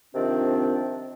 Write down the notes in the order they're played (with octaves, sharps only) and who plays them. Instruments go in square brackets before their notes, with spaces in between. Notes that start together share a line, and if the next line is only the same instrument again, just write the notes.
[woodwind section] C3 D#3 F3 C4 D4